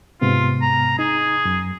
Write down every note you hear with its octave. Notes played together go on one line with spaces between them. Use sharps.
G#2 C3 B3 F4
A#5
D#4 G#4
F#2